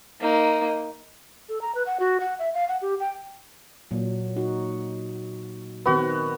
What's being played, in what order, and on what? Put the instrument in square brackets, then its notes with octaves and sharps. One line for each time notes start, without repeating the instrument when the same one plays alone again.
[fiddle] A#3 D#4
[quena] A4
A#5
B4
F#5
F#4
F#5
E5
F5
F#5
G4
G5
[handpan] A#2 F#3
D#4 F#4
[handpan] D#3 C4 B4 [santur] B3 F#4